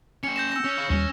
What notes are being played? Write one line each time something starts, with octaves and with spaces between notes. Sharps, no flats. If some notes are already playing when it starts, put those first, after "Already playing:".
C#4 G5 C#7
G6 A#6 E7
E6 A#6
C#4
C#5 F5
D#2 G3 C#4